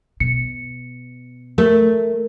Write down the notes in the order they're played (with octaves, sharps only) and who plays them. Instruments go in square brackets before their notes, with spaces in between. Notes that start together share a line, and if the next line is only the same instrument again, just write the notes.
[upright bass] B2 [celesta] C#7
[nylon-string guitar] A3 [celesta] A#4